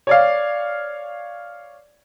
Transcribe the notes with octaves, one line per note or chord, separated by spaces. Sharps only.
C#5 D5 F5